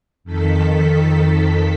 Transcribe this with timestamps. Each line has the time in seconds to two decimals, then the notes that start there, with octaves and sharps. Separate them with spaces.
0.24 F2 D#3 A4 B6